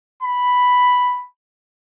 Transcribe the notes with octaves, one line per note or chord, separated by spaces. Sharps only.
B5